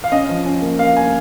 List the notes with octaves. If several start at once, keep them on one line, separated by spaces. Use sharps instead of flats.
F5
C#4 D#5
F3
C#4
A#3
A#3 F5
A#3 G#5